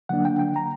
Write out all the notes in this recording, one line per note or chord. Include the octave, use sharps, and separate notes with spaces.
D3 F#3 A#3 D4 F#5
G5
G5
A#5